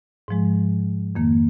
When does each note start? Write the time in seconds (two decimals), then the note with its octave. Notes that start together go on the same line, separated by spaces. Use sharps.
0.28 G#2 F3 G#3
1.15 F2 D#3 A#3